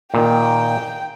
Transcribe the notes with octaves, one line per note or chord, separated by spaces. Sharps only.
A#2 D#3 G5